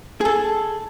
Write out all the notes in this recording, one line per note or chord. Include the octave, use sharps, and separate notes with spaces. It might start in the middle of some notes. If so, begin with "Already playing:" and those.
G#4 A4